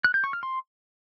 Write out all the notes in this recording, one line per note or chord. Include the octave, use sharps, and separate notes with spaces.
F#6
G6
C#6
F6
C6